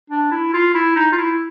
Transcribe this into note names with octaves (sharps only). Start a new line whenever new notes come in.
D4
E4
F4
E4
D#4
F4
E4